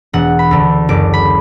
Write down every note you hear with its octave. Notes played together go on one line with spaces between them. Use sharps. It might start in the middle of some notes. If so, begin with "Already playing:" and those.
E1 F#5
B5
D2 D3
F#1 D6
B5